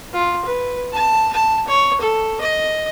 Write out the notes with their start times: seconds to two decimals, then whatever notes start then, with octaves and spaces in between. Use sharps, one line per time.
0.13 F4
0.45 B4
0.93 A5
1.33 A5
1.68 C#5
2.01 A4
2.41 D#5